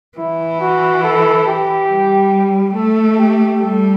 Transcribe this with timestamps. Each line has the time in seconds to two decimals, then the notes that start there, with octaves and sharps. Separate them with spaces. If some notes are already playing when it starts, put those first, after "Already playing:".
0.18 E3 E4
0.61 F#4
1.04 A4
1.46 G4
1.89 G3
2.75 A3 A4
3.18 G4
3.60 G3 A4